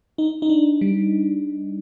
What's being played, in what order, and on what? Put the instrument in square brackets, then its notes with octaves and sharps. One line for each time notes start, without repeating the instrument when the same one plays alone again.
[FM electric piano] D#4
D#4
D4
G3